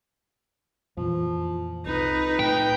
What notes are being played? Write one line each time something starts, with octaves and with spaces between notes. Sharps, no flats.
F2 A#2 E3 F3
C2 F2 D#4 B4
A2 G5